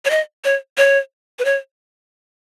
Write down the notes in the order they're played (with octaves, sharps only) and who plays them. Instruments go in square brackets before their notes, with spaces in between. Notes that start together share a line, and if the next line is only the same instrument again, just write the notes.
[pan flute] C#5
D#5
C#5
C#5
B4
C#5